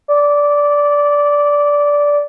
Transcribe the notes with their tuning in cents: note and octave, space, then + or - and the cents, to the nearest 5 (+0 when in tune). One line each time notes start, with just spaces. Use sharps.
D5 -15